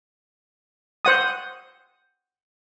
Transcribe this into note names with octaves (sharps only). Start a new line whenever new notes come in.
C5 F#5 D#6